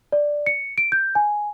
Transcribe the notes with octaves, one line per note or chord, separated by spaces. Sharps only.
D5
C#7
D7
G6
G#5